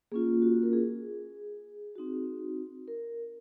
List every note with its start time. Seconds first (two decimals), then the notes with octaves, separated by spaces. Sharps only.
0.12 A#3 C#4 F4 G#4
0.42 F#4
0.63 A#4
0.73 G#4
1.96 C4 D#4 F#4
2.88 A#4